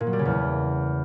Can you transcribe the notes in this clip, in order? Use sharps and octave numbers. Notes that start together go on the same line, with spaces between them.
A#2
F#3
G3
C#3
E2